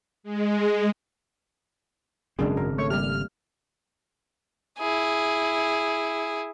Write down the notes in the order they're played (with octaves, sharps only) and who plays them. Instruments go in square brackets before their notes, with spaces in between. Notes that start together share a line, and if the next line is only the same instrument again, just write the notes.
[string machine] G#3
[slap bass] G#1 C#3 C4 [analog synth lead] F#2 [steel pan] G#3 D4 G#4
[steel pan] A#4
[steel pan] A3 [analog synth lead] C#5
[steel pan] G3 A#3 G4 [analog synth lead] F6
[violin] E4 G#4